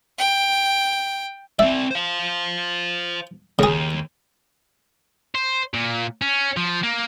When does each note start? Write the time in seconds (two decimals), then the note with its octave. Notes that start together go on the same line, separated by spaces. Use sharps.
0.18 G5
1.59 C4 D5 E5
1.91 C5 F5
3.59 D#2 C#3 G#4
5.35 C5
5.74 A#2
6.21 C#4
6.57 F3
6.83 A#3